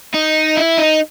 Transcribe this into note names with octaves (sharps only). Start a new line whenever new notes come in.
D#4
E4
D#4